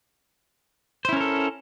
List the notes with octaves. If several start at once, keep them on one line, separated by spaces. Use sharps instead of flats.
C#4 E4 A4 A#4 C5